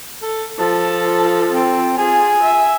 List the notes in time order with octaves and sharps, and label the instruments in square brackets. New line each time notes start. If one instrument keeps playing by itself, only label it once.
[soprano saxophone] A4
[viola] F3 A4 [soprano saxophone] A5
[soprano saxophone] C4
[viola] F4 G#4 [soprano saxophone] G#5
[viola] E5